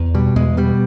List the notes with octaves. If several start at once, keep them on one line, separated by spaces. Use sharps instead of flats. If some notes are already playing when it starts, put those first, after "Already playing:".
Already playing: E2
B2 G3
E2 G#3
B2 G3